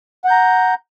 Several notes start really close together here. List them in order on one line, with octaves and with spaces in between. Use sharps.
F#5 G6 A#5